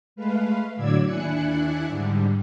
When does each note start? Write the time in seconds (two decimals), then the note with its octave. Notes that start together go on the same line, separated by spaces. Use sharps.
0.16 G#3 A3 B4 F5
0.76 A2 D3 F#3 D5 E6 G#6
1.05 D#2 D4 E4 G#5 F#6 C#7
1.88 G#2 D3 G3